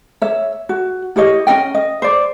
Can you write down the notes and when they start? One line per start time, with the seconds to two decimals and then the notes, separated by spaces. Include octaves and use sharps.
0.22 C#5 E5
0.69 F#4
1.16 E4 G4 C#5 D#5
1.47 C#4 F4 D#5 G5
1.75 D#5
2.02 C5 D5